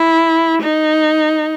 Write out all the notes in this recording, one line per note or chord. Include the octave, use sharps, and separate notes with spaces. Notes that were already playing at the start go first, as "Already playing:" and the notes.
Already playing: E4
D#4